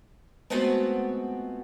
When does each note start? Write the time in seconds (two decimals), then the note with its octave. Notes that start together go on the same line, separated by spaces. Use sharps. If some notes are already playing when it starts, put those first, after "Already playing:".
0.50 G#3 A3 B3 C4 F4 F#4